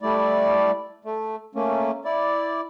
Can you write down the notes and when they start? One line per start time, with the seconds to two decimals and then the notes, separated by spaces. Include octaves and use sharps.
0.01 G3 A3 E4 D5
1.05 A3
1.55 A3 A#3 C#4
2.05 E4 D5